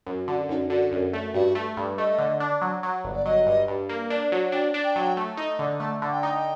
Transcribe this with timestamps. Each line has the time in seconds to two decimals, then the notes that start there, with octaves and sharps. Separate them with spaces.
0.06 F#2
0.28 D3 F#4
0.49 F#2 D#4
0.70 D3 F#4
0.92 F#2
1.14 A3
1.34 G2 F#4
1.55 A3
1.77 G2
1.97 A3 D#5
2.19 D3
2.40 D4
2.62 F#3
2.83 F#3
3.04 G1
3.14 D5
3.25 F#3 D#5
3.47 G2
3.68 G2
3.89 A#3
4.10 D4
4.32 F#3
4.52 D4 G5
4.74 D4
4.84 G5
4.96 F#3
5.17 A3
5.37 D#4
5.59 D3
5.80 A3 A5
6.02 D3
6.12 G5
6.23 D#4